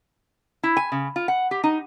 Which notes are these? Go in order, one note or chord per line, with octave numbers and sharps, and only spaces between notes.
E4
G#5
C#3
F4
F#5
G4
D#4